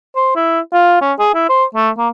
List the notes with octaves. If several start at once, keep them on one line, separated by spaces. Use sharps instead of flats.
C5
E4
F4
C#4
G#4
E4
C5
A3
A#3